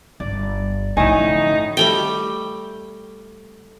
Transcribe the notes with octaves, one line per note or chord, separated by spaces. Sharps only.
G1 D5
F#2 A2 D3 F3 D#4 E4 G#5
G3 A3 G5